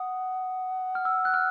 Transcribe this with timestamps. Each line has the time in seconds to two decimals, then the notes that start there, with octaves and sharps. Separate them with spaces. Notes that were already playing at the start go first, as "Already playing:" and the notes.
Already playing: F#5 D#6
0.95 F6
1.05 E6
1.25 F#6
1.34 F6